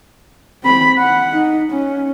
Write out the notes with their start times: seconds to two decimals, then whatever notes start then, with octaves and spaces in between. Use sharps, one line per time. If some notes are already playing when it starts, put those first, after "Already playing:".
0.63 C4 B5
0.98 F#5
1.33 D#4
1.72 C#4